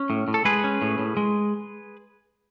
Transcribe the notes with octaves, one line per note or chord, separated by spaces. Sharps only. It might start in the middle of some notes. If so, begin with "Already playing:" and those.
Already playing: C#4
A2
A2
A4
G#3 G#4 B4
C#4
A2
A2
G#3